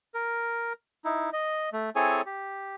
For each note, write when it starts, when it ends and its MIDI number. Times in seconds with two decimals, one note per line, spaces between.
0.14 0.73 70
1.05 1.30 63
1.05 1.30 64
1.33 1.69 75
1.73 1.90 57
1.96 2.22 60
1.96 2.22 64
1.96 2.22 68
1.96 2.22 69
1.96 2.22 73
1.96 2.22 80
2.26 2.76 67